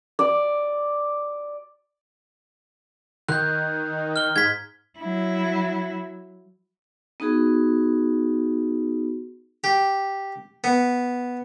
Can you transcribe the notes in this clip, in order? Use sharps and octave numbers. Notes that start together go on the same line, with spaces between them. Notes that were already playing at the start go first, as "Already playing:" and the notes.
D5
D#3 F#6 G6
F6 G7
G#2 G#6 B6
F#3 E4
B3 D#4 F#4 G#4
G4
B3